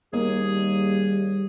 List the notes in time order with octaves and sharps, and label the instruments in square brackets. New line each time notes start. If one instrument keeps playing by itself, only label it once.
[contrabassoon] D#2 [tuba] G3 [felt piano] A#3 [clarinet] G#4